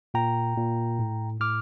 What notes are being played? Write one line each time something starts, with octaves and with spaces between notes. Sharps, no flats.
A#2 G5 A#5
A#2
A2
A2 D6 F6